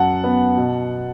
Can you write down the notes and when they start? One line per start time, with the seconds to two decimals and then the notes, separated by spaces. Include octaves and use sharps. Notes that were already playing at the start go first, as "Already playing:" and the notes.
Already playing: F#2 F#5 A5
0.24 B3
0.57 B2